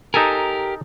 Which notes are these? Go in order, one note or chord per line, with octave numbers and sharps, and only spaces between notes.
D#4 G4 A4 A#4 G#5